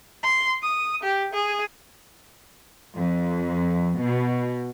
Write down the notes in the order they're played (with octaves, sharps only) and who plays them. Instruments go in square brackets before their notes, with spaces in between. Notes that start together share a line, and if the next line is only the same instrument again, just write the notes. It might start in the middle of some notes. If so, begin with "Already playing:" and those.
[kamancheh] C6
D#6
G4
G#4
[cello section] F2
B2